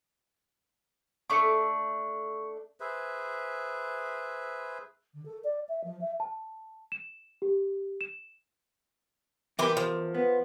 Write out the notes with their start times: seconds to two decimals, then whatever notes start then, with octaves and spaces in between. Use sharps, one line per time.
1.30 A3 D4 C#6 D6 C#7
2.80 G#4 B4 C5 E5
5.14 D3
5.25 A4
5.44 D5
5.68 E5
5.84 F3
6.01 E5
6.20 A5
6.92 E7
7.42 G4
8.01 E7
9.59 E2 E3 G4 A#4 B4 C6
9.77 F3
10.15 B3